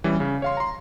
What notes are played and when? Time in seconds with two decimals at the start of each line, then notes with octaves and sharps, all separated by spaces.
0.04 E3 G3 C#4
0.20 C#3
0.42 C#5 F5 C6
0.57 A#5 C6